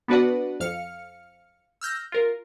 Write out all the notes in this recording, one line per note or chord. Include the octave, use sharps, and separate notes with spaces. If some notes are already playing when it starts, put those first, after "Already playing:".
B3 D4 F#4 B4 D5 F#5
F2 F5 F6 C#7
E6 F6 G6 A#6
F4 A#4